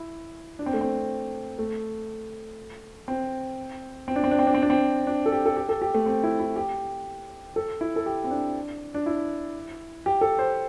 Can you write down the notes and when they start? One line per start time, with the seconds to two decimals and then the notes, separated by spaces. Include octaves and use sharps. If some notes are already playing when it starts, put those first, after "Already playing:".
Already playing: E4
0.59 D4
0.66 C4
0.74 A3
0.81 C4
1.59 A3
3.08 C4
4.08 C4
4.16 D4
4.24 C4
4.31 D4
4.39 C4
4.47 D4
4.54 C4
4.62 D4
4.70 C4
5.07 D4
5.26 A4
5.32 G4
5.46 A4
5.56 G4
5.69 A4
5.82 G4
5.94 A3
6.06 C4
6.24 E4
6.39 E4
6.56 G4
7.56 A4
7.81 E4
7.96 A4
8.06 G4
8.24 C4
8.31 D4
8.94 D4
9.06 E4
10.06 G4
10.21 A4
10.39 C5